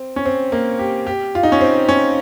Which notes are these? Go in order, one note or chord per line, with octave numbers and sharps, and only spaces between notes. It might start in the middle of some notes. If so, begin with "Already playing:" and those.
Already playing: C4
C#4
C4
A#3
G4
G4
F4
D#4
C#4
C4
C#4